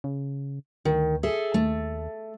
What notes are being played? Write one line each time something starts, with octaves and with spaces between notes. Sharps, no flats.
C#3
D2 D#3
G#4 A4 E5
D#2 A3